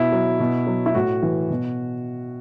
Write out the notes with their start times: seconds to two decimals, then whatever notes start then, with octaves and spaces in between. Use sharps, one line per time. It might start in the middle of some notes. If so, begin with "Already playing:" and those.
Already playing: B2 E4
0.12 F#3
0.40 B2
0.67 F#3
0.86 E4
0.95 A2 F#4
1.23 E3
1.50 B2